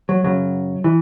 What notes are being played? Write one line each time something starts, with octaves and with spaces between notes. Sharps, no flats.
F#3
F#2 C#3 F#3
E3